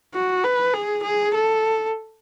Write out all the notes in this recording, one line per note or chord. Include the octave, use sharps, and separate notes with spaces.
F#4
B4
G#4
G#4
A4